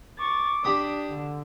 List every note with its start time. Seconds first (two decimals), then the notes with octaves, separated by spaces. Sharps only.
0.20 C#6 D6 A6
0.64 D4 G4 B5 D#6
1.09 D3